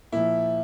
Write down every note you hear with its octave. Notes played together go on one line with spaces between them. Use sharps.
A#2 F3 E4